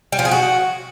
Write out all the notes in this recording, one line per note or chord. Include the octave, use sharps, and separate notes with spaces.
G3
F3
G#4
F#4